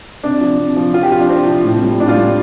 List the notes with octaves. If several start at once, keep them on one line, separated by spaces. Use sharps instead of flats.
C3 D4
F3
C3
F3
C3 F4
G4
F3 F4
D4
C3 C4
F3
A2
G3
A2 D4
F4
G3 D4